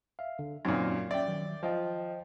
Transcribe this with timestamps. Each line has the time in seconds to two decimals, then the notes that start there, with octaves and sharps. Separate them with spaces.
0.19 E5 F5
0.39 D3
0.65 F#2 A#2 C4 D#4
1.11 C#4 D5 E5 G5
1.28 D#3 F#3
1.63 F3 C5 D#5 G5